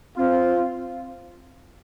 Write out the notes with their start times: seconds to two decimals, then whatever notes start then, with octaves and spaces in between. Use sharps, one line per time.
0.17 C4 F4